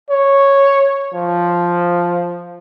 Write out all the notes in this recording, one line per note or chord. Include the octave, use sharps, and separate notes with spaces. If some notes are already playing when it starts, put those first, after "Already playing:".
C#5
F3